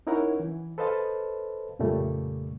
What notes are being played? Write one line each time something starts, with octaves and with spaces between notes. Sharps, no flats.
C#4 D#4 E4 A#4 C#5 F#5
E3
A4 B4 C5 D#5 F5 A5
F2 A#2 C#3 G3 A3